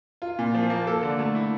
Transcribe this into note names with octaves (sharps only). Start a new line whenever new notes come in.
F4
A#2
F3
A#3
A4
D3
A3
E4